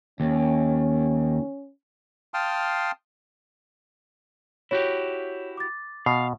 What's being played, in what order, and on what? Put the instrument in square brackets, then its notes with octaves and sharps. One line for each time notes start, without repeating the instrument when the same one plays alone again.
[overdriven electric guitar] D#2 [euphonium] C#4
[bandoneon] F5 G5 A5 C6 D#6 F6
[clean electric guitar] E4 F#4 G4 [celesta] C#5
[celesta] D6 A6
[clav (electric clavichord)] B2 [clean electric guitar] F5